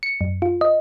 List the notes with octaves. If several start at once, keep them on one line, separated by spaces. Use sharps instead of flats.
C#7
F#2
F4
D#5